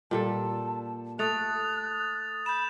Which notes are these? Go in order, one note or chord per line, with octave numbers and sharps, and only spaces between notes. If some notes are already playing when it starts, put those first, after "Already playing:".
A#2 G3 A4 A5
A3 D#6 F#6 A6 F7
B5 G6 E7